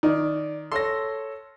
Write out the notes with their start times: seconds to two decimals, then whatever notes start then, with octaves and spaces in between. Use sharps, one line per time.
0.03 D#3 D5
0.72 A4 C#5 C6 A#6